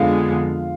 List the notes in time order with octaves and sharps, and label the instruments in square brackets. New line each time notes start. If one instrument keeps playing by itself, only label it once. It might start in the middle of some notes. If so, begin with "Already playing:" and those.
Already playing: [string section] F2 D3 G#3 B3 [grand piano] F4 F5